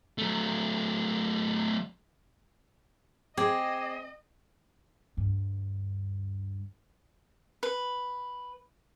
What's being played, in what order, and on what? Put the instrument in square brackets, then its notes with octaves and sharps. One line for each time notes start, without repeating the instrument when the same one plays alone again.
[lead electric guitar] F#3 A3
[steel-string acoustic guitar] C4 [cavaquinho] G#4 G5 [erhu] D#5 [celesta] D6
[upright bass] D2 G2
[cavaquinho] B4